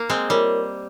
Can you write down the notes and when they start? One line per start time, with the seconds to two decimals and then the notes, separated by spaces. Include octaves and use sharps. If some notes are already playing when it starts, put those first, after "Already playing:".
Already playing: A#3
0.09 G#3 C4
0.29 G3 F4 A#4 C#5